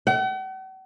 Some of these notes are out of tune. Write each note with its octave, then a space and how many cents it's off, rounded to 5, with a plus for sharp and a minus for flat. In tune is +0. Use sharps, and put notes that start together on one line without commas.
F#5 +45